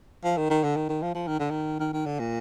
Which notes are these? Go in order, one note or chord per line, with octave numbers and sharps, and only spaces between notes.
F3
D#3
D#3
D3
D#3
D#3
F3
F3
D#3
D3
D#3
D#3
D#3
D3
A#2